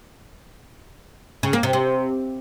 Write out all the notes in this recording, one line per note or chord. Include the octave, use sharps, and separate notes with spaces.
C#3
A#3
C3
C3